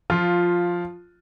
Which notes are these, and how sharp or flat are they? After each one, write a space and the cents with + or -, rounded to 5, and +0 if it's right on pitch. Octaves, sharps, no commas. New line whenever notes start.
F3 +10 F4 +0